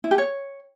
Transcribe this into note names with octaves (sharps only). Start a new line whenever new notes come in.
E4
G4
C#5